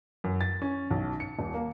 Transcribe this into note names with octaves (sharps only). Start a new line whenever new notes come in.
F#2
A6
C#4
B1
C#7
D#1
A#3